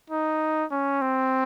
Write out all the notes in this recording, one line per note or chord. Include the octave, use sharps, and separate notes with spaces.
D#4
C#4
C4